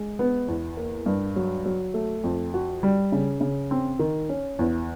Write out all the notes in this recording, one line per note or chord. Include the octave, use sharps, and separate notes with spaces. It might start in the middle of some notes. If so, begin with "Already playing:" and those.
Already playing: G#3
B3
E2
A#3
G2
F#3
F#3
A3
F2
F#4
G3
C#3
C#3
C4
D#3
C#4
E2